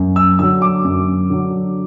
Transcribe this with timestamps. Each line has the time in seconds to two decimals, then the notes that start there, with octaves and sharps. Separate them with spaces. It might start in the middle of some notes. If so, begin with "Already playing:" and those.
Already playing: F#2
0.16 E6
0.39 D3 F#3 E6
0.62 D6
0.84 F#2
1.30 D3 F#3